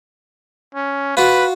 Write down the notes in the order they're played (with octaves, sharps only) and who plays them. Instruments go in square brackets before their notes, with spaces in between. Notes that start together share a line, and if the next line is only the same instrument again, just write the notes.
[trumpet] C#4
[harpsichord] F4 F#4 [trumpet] B4